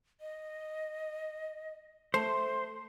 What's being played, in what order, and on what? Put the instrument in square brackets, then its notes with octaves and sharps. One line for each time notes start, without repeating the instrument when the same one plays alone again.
[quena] D#5
[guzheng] A3 [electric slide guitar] C5 [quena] C6